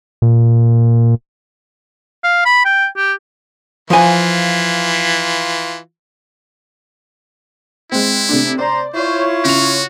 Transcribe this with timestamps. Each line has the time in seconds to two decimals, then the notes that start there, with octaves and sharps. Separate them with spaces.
0.22 A#2
2.24 F5
2.46 B5
2.65 G5
2.97 G4
3.90 E3 F3 F4 G#5
7.92 G#3 C4 E4
8.29 C3 A3 D4
8.59 C5 D5 A#5
8.94 E4 F4 C5 C#5
9.45 C#3 F#4 F7